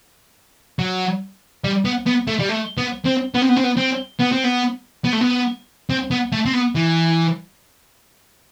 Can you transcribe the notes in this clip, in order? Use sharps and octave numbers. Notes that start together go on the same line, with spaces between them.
F#3
G3
B3
B3
A3
G3
A3
B3
C4
B3
C4
B3
C4
B3
C4
B3
C4
B3
B3
A3
B3
C4
B3
A3
C4
B3
E3